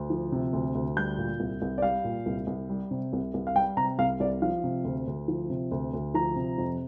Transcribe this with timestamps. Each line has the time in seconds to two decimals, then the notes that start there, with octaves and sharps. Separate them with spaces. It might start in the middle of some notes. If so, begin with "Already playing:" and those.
Already playing: D2
0.10 F3
0.32 C3
0.53 D2
0.75 D2
0.96 G3 G6
1.18 A#2
1.40 C2
1.62 C2
1.78 D5
1.82 G3 F5
2.04 A#2
2.26 C2
2.47 C2
2.70 G3
2.91 C3
3.13 C2
3.34 C2
3.47 F5
3.55 G3 G5
3.77 C3 A#5
3.99 C2 F5
4.20 C2 D5
4.42 F3 F5
4.64 C3
4.85 D2
5.07 D2
5.28 F3
5.50 C3
5.71 D2
5.93 D2
6.14 F3 A#5
6.36 C3
6.58 F2